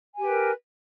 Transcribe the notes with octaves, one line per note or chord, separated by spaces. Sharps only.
G4 A#4 B4 G#5